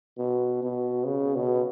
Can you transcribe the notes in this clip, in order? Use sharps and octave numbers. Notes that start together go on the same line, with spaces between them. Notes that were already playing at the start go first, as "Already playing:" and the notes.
B2
B2
C#3
B2